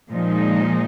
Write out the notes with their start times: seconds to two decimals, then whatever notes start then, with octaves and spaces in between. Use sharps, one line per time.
0.10 A#2 F3 G#3 D#4